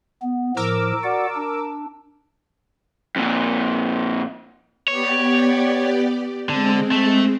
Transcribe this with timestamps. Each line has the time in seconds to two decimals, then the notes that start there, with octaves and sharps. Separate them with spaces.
0.22 B3
0.57 A2 F3 A#4 D6 E6
1.03 F#4 D5 F#5
1.35 D4
3.16 F2 A#2
4.88 B3 G4 C#5 D5
6.49 D3 G#3 C4
6.91 A3